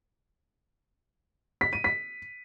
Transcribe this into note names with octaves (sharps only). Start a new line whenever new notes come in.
B6
D#7
B6